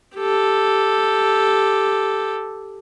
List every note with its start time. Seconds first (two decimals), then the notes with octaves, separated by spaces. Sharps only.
0.16 G4 A4